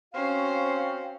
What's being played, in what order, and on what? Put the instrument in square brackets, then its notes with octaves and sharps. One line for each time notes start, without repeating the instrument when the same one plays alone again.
[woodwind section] C4 F#4 F5 [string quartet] C#4 C5